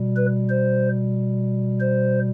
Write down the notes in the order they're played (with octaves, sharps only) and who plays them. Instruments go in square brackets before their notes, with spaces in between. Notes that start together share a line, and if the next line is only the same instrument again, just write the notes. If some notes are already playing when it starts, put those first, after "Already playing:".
Already playing: [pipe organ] B2 G3
B4
C5
C5